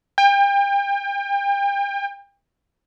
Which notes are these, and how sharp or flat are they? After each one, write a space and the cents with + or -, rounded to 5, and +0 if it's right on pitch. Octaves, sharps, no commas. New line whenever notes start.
G5 +35